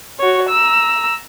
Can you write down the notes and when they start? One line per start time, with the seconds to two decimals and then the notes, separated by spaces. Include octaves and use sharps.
0.19 F#4 C#5
0.50 A#5 E6